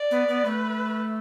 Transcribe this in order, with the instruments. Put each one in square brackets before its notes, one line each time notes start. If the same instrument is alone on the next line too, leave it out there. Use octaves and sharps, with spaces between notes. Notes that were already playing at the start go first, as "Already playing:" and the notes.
Already playing: [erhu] D5
[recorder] B3
B3
[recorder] A3 [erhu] B4